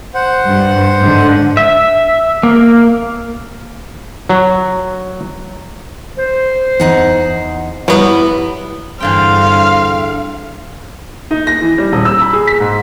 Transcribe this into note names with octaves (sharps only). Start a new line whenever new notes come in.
C5 F#5
G2
G#2 D3
E5
A#3
F#3
C5
E2 D#4 F#5
F#3 G3 B3 E4
E2 G2 D3 C4 F5 G5
D#4
A#6
E3
G3
D#1
E6
B5
G#4
B6
G#2